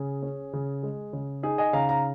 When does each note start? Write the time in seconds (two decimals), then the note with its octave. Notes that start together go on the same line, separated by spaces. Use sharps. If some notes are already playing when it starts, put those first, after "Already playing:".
Already playing: C#3 G#4
0.23 C#4
0.53 C#3
0.83 G#3
1.13 C#3
1.43 D#4 G#4
1.58 D#5 G#5
1.73 C#3 F5 A#5
1.89 F5 A#5